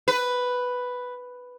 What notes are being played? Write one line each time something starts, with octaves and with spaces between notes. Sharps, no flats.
B4